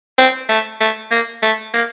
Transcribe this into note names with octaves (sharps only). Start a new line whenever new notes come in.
C4
A3
A3
A#3
A3
A#3